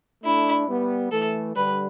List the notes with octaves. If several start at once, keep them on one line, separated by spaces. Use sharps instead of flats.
A3 D4 E4
G3 B3
E3 A3 A4
D3 G3 B4